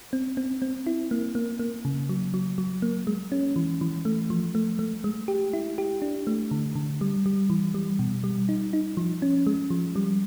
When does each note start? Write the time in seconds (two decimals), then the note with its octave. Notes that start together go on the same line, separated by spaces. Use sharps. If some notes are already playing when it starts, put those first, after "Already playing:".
0.13 C4
0.37 C4
0.62 C4
0.87 E4
1.11 A#3
1.35 A#3
1.59 A#3
1.85 C#3
2.09 F#3
2.34 F#3
2.58 F#3
2.82 A#3
3.07 G#3
3.32 C#4
3.56 E3
3.81 E3
4.05 A3
4.30 F3
4.55 A3
4.79 A3
5.04 G#3
5.28 G4
5.53 E4
5.78 G4
6.02 D4
6.27 A3
6.51 D3
6.76 D3
7.01 G3
7.26 G3
7.50 E3
7.74 G3
7.99 B2
8.24 G3
8.49 D#4
8.73 D#4
8.97 F3
9.22 C#4
9.47 G#3
9.70 F3
9.96 G3